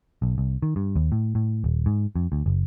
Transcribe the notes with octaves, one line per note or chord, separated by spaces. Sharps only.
B1
C2
D#3
G2
D#2
A2
A2
D#1
G#2
F2
D2
F#1